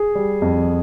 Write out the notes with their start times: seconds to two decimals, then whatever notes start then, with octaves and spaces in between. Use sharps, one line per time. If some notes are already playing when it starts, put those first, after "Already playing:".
Already playing: G#4
0.15 G3
0.42 F2